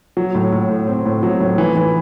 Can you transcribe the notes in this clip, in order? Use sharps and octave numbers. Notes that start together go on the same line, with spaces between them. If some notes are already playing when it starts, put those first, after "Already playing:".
F#3
A2
A2
A2
C4
A2
F#3
A2
E3
E3